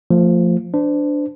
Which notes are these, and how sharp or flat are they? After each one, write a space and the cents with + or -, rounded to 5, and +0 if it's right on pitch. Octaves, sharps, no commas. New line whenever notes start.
F3 +0 A3 +35
D4 +0 C5 -35